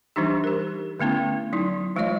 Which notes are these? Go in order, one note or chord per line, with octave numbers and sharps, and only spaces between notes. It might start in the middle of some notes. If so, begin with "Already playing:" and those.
E3 G3 D4 D#4 G4
G4 A#4
D3 A3 B3 C#4 E4
F#3 D#4 E4
E3 G#3 A3 F4 C#5 D#5